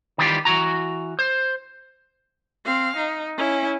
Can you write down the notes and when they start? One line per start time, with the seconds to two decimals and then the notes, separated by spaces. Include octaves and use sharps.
0.18 D#3 E3 G3 F4 G4
0.45 E3 F#4 A#5
1.19 C5
2.66 C4 F5
2.97 D#4
3.37 C#4 E4